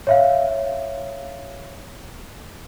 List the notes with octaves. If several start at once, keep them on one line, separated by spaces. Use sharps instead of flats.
C#5 E5 F5